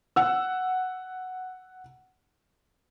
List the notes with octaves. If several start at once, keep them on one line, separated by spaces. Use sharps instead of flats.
F#5 E6